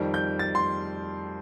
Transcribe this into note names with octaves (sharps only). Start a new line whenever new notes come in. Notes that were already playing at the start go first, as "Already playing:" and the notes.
Already playing: F2 D#3 G3
G6
A6
C6